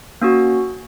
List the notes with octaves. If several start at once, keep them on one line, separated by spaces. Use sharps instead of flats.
A#3 C#4 F#4